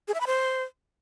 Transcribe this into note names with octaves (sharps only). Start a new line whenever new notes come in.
G#4
E5
B5
C5